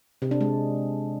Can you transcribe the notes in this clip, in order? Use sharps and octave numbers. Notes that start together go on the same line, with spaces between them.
C3
D4
G#3